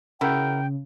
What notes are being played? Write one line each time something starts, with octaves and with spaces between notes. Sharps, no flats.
C#3 E4 F#4 A#4 G5